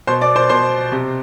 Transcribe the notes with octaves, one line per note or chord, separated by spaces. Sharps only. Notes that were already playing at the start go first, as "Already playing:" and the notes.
B2 C5 C6
D5 D6
C5 C6
B2 C5 C6
C3